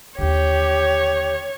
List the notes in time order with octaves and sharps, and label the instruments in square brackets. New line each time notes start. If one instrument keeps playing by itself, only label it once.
[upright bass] D#2 D3 [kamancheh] G4 [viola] C#5